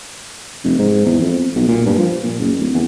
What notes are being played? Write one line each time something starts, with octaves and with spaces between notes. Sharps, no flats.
F1
G#2
E2
F2
B1
A#2
G2
F3
A#2
F#1
D1
E2